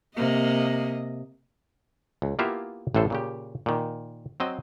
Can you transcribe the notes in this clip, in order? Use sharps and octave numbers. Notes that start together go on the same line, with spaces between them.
C3 A#3 D#5
C#2
A#3 B3 E4 F4 G4 E5
A1 A2 A4 C5
A#2 C#3 G4
A#2 D#3
F#3 C4 D#5